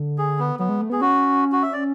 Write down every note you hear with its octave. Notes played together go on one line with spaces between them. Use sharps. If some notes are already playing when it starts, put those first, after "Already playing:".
Already playing: D3
G#4
B3
F#3 B3
G#3
A3
B3 G#4
C#4 F#4
F#4
E5
D5